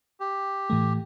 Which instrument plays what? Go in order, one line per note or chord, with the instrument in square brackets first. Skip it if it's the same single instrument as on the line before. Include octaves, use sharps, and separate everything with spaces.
[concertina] G4
[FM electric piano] A2 E3 A3